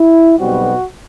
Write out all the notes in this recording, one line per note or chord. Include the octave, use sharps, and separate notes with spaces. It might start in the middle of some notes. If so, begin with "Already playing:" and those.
Already playing: E4
B1 B2 G3 C4 F#4